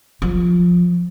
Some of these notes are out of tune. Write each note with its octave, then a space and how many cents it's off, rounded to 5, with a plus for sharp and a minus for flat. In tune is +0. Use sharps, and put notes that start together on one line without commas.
F3 +10